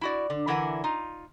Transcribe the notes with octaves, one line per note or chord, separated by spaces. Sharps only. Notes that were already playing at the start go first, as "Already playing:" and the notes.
E4 F#4 D5
D3
D3 E3 E4 A#4 F#5 G#5
D#4 F4